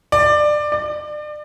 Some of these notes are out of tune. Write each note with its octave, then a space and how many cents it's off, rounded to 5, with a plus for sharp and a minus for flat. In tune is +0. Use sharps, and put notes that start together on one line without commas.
D5 +20
D5 +35